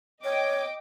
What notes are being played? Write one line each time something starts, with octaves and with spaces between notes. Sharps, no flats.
C#5 D#5 G5 D6